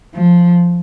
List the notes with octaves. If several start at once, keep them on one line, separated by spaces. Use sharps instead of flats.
F3